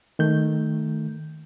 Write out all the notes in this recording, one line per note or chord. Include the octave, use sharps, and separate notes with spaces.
D#3 A3 G6